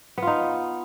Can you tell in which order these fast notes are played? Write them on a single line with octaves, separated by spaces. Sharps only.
B3 F4 D#4